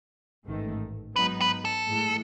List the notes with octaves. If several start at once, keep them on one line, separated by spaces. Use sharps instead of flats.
A1 G#2 D#3 A3
G#2 F#3 B3 D#4 B4
B4
A4
A2 E3 G#3